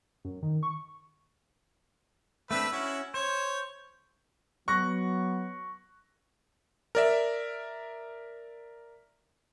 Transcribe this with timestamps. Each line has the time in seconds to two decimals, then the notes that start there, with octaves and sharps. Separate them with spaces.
0.25 F#2
0.42 D#3
0.63 C#6
2.51 A3 C4 D4 B4 E5
2.72 C#4 E4 F#4
3.14 C5 C#5
4.68 F#3 B3 C#6 F#6 A#6
6.95 A#4 D5 E5